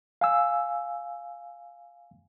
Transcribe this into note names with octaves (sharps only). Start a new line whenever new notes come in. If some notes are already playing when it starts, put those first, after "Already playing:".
F5 G#5 E6